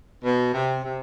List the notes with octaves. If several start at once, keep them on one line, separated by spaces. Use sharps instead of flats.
B2
C3
C3